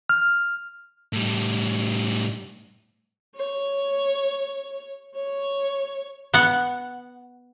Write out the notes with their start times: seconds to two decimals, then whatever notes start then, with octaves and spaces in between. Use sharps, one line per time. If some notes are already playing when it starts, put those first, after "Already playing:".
0.09 F6
1.13 A2 G3
3.36 C#5
5.16 C#5
6.34 B3 F#5